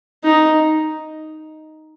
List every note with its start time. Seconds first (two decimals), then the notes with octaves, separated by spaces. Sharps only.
0.24 D#4